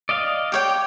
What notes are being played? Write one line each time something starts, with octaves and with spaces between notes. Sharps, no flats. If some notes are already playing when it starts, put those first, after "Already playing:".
D5 D#5 F5
G4 C#5 G5